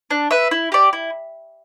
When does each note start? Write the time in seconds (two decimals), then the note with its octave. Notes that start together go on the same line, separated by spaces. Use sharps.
0.10 D4
0.31 B4 E5
0.51 E4
0.72 G4 D5
0.93 E4